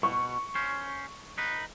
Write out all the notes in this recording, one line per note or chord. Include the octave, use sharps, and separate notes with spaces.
B2 C#6
C#4 C5
D#4 B4